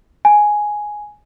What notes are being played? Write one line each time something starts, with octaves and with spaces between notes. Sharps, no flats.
G#5